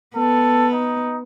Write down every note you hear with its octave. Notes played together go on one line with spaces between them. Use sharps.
B3 A4
D#4